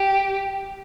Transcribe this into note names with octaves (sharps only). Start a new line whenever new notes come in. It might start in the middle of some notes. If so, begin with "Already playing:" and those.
Already playing: G4